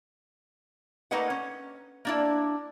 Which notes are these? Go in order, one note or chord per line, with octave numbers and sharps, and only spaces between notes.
A3 A#3 D#4 B4 D#5 F#5
C#4
A#3 D4 E4